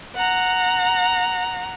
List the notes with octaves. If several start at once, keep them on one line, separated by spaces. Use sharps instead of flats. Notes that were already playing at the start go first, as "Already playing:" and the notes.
F#5 A#5